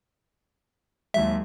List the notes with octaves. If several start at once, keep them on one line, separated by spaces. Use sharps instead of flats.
D#2 F#3 G#3 E5